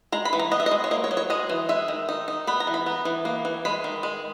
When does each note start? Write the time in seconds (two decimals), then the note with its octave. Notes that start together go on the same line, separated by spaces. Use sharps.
0.12 G#3 A#5
0.25 B5
0.33 E3
0.39 A#5
0.51 B3 D#5
0.60 E5
0.66 D#5
0.71 G#3
0.84 C#5
0.91 A#3 D#5
1.04 C#5
1.11 F#3
1.17 C#5
1.30 G#3 D#5
1.49 E3
1.69 G#3 E5
1.88 D#3
2.09 D#4
2.28 D#4
2.47 B3 B5
2.60 A#5
2.67 E3
2.74 B5
2.86 B3
3.05 E3
3.25 A#3
3.45 E3
3.65 G#3 B5
3.84 D#3
4.03 G#3